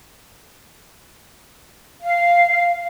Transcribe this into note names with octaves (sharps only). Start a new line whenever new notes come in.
F5